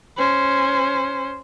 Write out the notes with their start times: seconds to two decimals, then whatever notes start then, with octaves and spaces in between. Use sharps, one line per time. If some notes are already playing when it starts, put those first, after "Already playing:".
0.17 C#4 C5